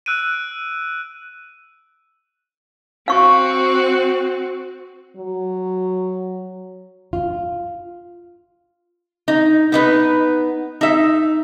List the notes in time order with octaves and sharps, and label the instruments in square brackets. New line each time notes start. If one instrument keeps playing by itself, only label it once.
[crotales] E6 F#6 D7 D#7
[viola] C4 F#4 [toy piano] F5 C#6
[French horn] F#3
[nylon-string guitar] F4
[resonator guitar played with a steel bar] D#4
B3 D#4 B4
D#4 E5